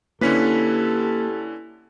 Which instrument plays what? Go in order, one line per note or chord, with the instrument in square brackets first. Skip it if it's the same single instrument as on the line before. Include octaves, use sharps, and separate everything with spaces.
[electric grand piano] D3 C#4 B4 [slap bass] A#3 [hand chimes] E4 B6 [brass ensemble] G4 A4